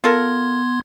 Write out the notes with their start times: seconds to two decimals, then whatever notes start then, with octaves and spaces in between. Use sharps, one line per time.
0.04 B3 F4 A4 A#4 C6 G#6